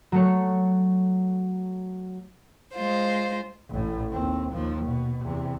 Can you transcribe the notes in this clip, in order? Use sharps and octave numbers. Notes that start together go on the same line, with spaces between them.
F#3 A3 C#5
G#3 F4 C5
A1 A2
D#2 C4
D#2 F3
B2
E2 C3